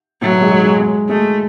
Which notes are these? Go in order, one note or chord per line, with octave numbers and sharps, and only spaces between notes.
A2 F#3 A3
B2 B3
G#3
G#3
G#3
G#3
G#3 A3